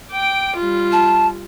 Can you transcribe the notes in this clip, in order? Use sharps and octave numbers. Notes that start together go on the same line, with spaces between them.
G5 D6
G3 F4
A5